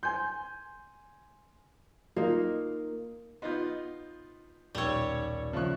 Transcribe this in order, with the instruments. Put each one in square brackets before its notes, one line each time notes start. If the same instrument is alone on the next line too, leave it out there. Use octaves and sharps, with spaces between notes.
[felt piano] G#5 C6 [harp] G6
[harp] A#3 D#4 [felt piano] F4
[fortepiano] B3 D#4 F4 [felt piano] C6 G6
[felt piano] D#1 B1 E6 [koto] G3 C#5
[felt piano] C#3 E5 F#6 [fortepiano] F3 C#6